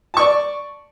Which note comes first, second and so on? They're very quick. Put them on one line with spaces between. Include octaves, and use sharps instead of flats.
A5 C#6 D5